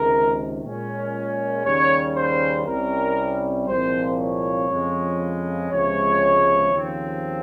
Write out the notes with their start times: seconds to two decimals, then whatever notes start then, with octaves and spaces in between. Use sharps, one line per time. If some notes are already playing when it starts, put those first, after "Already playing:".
Already playing: C#2 C3 D#3 G#3 A#4
0.63 A#2 G#3 C#4
1.64 D#2 C#3 G3 C#4 C#5
2.15 C5
2.66 C2 C3 G3 C#4 A#4
3.67 C2 A#2 F3 G#3 C4 C5
4.18 C#5
4.69 F2 C#3 F3 G#3
5.70 C#2 C3 F3 G#3 C#5
6.72 D#2 C#3 F3 C4